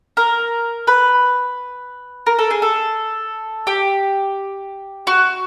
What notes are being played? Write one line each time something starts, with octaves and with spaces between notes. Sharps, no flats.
A#4
B4
A#4
A4
G#4
A4
G4
F#4